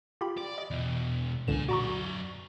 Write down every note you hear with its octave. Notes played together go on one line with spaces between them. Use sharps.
F4 G4 B5
D5
D#5
E2 B2
C#2 A#2 D3 G#5 E7
F#2 F#4 D5 A#5 C#6